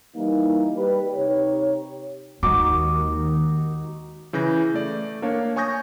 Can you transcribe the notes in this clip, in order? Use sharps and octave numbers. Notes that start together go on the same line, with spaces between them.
E3 G3 A#3 D#4
G3 B4
C3 D#4 G4 C#5
D#2 D#3 G#3 D#4 F#4 D6
C#3 E3 G6 A#6
A3 D5
A#3 D4 C#5 F5
C#5 G#5 C#6 D#6 G6 A#6